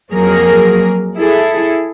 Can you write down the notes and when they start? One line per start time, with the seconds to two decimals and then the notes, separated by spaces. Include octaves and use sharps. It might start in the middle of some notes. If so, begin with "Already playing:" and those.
0.11 F2 F#3 A#3 G#4 A#4
1.16 E4 G#4 A4